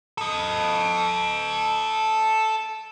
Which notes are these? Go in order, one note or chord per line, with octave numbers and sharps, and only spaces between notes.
A4 D#5